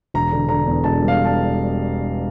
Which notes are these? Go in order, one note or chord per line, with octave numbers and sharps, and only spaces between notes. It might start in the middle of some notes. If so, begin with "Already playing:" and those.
E1 A#5
D3
D3 A#5
E2
E1 A5
G3
F5
A5